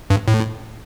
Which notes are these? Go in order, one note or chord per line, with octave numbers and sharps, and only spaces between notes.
G2
A2